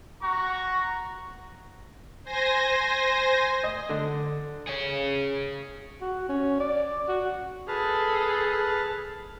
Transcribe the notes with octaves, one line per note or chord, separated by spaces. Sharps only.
F#4 A#5 C#6
C5 G#5 A#6
D#5
D3
G#4 C#5
F#4
C#4
D5
F#4
G#4 A4 B4 A5 F6